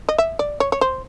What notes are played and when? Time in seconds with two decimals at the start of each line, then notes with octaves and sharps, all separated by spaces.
0.09 D#5
0.18 E5
0.39 D5
0.60 C#5
0.72 C#5
0.81 C5